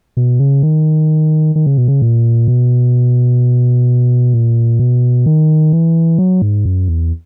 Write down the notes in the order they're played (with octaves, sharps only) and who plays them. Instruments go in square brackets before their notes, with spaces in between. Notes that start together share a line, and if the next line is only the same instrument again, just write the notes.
[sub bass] B2
C#3
D#3
D#3
C#3
B2
C#3
A#2
B2
A#2
B2
D#3
E3
F#3
G#2
F#2
E2